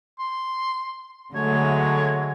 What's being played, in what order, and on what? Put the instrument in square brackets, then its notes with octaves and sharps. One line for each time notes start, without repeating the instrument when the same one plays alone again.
[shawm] C6
[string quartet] D3 F#3 G#3 [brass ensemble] A3 [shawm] C#5